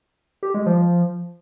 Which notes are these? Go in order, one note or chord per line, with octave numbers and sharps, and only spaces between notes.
G4
G#3
F3